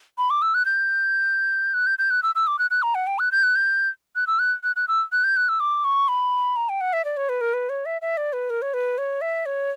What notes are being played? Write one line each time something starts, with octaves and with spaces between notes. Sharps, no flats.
B5
D6
E6
F#6
G6
F#6
G6
G6
F#6
E6
E6
D6
F#6
F#6
A#5
F#5
G5
F#6
G6
F#6
G6
F#6
E6
F#6
F#6
F#6
E6
F#6
G6
F#6
E6
D6
C#6
B5
A#5
G5
F#5
E5
D5
C#5
B4
A#4
B4
C#5
E5
E5
D5
B4
A#4
C#5
B4
C#5
E5
C#5